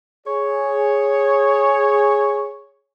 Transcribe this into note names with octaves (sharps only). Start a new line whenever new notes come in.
G#4 C#5